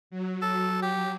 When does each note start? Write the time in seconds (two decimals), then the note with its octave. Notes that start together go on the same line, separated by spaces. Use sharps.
0.10 F#3
0.41 A4
0.82 G4